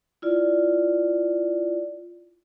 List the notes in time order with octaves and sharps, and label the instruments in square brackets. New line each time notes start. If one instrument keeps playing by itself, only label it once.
[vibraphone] E4 F4 D5